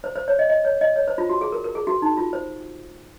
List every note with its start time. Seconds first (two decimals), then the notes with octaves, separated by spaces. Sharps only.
0.04 C5
0.16 C5
0.28 C#5
0.39 D#5
0.49 D#5
0.65 C#5
0.81 D#5
0.96 C#5
1.08 C5
1.18 F4
1.29 F#4
1.41 G#4
1.52 A#4
1.64 A#4
1.75 G#4
1.87 F#4
2.02 D#4
2.17 F4
2.33 C5